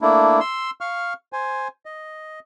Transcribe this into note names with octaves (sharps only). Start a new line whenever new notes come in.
A3 A#3 D4 E4
C6 E6
F5 C#6 F6
C5 G#5
D#5